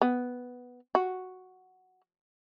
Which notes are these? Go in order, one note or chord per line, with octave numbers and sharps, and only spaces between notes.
B3
F#4